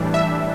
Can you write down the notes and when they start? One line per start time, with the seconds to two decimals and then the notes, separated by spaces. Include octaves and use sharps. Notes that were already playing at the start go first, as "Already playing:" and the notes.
Already playing: A2 E3 G3 D4
0.14 E5